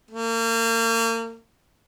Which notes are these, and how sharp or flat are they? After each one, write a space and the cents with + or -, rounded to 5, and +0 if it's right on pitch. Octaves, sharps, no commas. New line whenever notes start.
A#3 -35